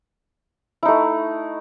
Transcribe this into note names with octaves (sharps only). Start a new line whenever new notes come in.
A3 D#4 E4